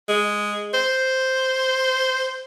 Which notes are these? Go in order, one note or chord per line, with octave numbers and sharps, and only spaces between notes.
G#3
C5